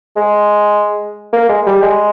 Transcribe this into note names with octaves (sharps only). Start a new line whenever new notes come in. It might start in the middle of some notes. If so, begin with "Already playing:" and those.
G#3
A#3
G#3
G3
G#3